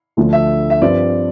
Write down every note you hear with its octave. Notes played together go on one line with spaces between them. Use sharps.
D2 D3 F3 A3 D4
E5
E5
G2 F3 C4 D5